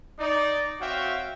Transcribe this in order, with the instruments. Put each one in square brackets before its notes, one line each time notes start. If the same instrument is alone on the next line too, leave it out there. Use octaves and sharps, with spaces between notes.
[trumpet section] D#4 D5
C4 F#4 C#5 E5 F5 G5